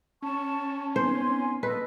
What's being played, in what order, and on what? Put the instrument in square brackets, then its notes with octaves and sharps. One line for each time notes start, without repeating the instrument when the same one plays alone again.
[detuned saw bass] C#4 [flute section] A5 C#6
[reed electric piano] B3 C4 D#4 [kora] C5 [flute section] G#5 C6
[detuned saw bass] A#2 [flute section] A4 D#5 [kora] B4